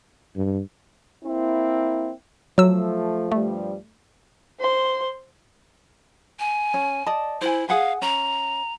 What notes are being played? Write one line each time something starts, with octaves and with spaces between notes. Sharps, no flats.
G2
A#3 C4 E4
F3 F#3 A3 E6
G2 F3 G3 A3
C5 C6
G#5
C#4
D5 D#5 A5
E4 C5 G#5
G#4 F5 F#5 G#5
C#4 A#5